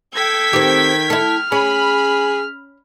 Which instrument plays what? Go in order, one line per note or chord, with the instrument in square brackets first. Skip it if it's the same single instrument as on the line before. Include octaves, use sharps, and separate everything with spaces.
[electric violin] A4 [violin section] G5 G#6 B6
[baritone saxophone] D#3 [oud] C4 G4
[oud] E4 A4 [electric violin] F6
[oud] C#4 [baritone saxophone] G#4 [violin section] B5